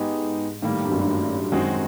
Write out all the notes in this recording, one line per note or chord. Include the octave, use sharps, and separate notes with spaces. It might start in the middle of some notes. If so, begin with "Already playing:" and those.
Already playing: G#2 G#3 B3 D#4 G4
A2 D#3 G3 A#3
G2
F#2
G2
F#2 D#3 G#3 C4 D#4 F#4